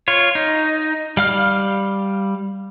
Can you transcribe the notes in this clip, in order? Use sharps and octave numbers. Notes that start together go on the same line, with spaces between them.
F4 C#5
D#4
G3 F5 F6